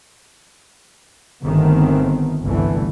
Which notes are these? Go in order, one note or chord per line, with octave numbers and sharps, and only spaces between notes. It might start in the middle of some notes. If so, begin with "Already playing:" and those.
G1 D#3 A3 B3 C4
G1 C2 D3 E3 A3